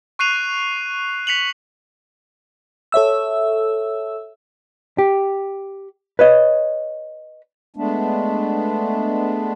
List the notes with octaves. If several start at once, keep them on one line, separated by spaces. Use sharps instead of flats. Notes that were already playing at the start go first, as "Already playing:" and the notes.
C#6 F#6 C7 D#7 F7
B6 C#7 F7 F#7
A4 C#5 E5 E6
G4
B4 C#5 D#5
G#3 A3 B3 D4